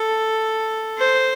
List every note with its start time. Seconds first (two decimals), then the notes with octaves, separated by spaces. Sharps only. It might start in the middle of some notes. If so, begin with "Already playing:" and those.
Already playing: A4
0.98 C5